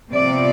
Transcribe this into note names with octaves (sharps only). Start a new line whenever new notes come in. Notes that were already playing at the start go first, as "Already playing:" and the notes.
C3 F3 B3 D5